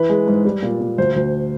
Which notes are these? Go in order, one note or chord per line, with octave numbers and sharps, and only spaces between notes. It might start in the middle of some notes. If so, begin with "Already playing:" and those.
Already playing: E3 B4
G#3
G#2
G3
A#2
A#2
D2 C5
D2